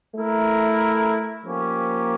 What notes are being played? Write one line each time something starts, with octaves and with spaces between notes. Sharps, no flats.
A3 E4 A#4
F3 A#3 C#4 G4